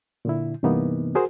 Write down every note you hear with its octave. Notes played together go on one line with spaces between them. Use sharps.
A#2 D3 E4
G2 C3 E3 A#3 B3 D#4
F#4 G#4 A#4 C5